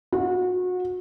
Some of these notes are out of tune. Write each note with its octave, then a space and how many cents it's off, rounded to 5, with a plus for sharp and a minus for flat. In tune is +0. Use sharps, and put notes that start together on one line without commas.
F#4 -30